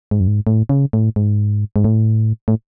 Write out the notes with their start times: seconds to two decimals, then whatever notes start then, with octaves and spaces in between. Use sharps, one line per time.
0.11 G#2
0.20 F#2
0.28 G#2
0.47 A2
0.69 C#3
0.93 A2
1.16 G#2
1.76 G#2
1.84 A2
2.48 A2